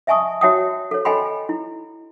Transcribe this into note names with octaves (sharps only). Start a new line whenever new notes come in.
D#5 E5 G#5 A5 C#6 D#6
F#4 C#5 E5 G5 A5 D#6
A4 C#5
A4 D#5 G5 G#5 B5 C6
E4